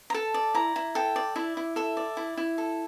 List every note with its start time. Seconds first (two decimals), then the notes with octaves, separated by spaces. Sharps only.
0.10 A#5
0.14 A4 A5
0.34 D5
0.54 E4 A#5
0.76 E4
0.95 A4 G5
1.16 D5
1.36 E4 E5
1.57 E4
1.76 A4 E5
1.97 D5
2.17 E4
2.37 E4
2.58 A4